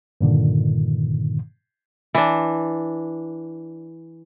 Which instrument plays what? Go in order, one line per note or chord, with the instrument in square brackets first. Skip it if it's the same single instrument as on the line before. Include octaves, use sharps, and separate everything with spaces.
[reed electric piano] G2 A#2 D3 D#3
[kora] E3 D4